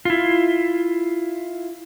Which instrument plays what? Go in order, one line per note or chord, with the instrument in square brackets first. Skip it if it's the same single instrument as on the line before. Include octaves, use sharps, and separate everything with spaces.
[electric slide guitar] E4 F4